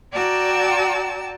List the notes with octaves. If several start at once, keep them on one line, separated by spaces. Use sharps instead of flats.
F#4 D5 G5 A5 A#5 E6